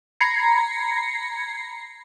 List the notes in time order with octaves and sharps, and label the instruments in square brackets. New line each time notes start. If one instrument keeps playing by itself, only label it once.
[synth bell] A#5 B5 G#6 A#6 C7 C#7